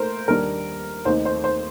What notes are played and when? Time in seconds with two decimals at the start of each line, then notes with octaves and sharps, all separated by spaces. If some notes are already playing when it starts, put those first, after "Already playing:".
Already playing: A3 A#4 C5
0.28 D#2 D#3 G3 D4 A#4
1.05 D#2 D#3 A3 C4 D#4 C5
1.25 C5
1.44 C5